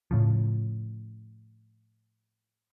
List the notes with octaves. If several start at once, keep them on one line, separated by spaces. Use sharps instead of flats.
A2 C#3 F3